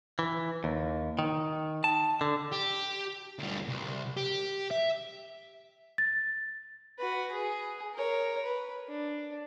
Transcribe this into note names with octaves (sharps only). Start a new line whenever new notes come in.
E3
D#2
D#3
A5
D3
G4
D2 G3
C2
G4
E5
A6
F#4 B4
G#4
A#4 C#5
B4
D4